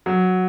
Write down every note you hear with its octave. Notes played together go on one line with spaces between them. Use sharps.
F#3